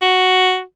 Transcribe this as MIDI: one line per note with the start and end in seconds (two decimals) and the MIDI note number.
0.02 0.62 66